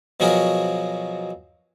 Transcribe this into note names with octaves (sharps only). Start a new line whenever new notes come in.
B2 F3 F#3 F#4 G#4 A#4